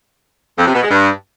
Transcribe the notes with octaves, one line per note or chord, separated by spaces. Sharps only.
F2
C3
B2
G#3
G2